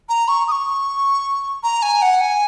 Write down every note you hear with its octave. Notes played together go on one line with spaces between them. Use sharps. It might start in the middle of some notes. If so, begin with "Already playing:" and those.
A#5
C#6
D#6
C#6
A#5
G#5
F#5
G#5